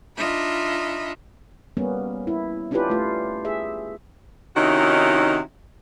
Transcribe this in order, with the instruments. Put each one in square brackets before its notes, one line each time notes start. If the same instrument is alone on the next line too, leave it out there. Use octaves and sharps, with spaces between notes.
[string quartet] D4 D#4 F4 D#5 E5 B5
[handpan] G3 A#3 B3 C#4
E4
C#4 D4 E4 F4 G4 B4
A3 F4
G#4 E5
[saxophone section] C3 D#3 C#4 D#4 E4 F#4